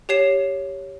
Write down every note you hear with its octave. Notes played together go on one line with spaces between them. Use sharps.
G4 C#5 C7 E7